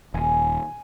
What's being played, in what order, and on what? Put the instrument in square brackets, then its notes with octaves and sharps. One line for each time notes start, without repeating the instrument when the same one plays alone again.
[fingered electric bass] D#1 [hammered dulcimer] G#5